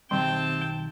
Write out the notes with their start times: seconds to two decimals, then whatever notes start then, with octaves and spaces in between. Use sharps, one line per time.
0.11 B1 C3 D#3 G3 C4 G5 A5 C6